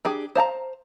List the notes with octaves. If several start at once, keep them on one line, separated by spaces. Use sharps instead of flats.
D4 G4 G#4
C5 F5 A5 A#5